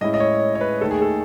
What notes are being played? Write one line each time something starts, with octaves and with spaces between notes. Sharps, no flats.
A2 G#3 C#4 E4 D#5
D#5
C#5
C#5
B4
D#2 D#3 A3 A4
G#4
A4